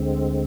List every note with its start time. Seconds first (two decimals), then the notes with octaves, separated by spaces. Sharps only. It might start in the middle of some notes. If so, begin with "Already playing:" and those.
Already playing: D2 D3 G#3 C4